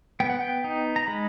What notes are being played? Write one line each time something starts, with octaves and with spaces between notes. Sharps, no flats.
B3 G5
F#5
G5
D#4
A#5
G#3 B5